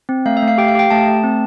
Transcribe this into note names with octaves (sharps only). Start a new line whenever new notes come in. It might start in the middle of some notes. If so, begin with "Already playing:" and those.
C4
A3 F5
E5
A3
F5
G4 G5
F5
G4 G5
A3 A5
A3
C4